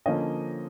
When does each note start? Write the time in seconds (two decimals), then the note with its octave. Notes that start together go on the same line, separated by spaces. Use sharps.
0.06 D3 F3 A#3 C#4 C#5 D#5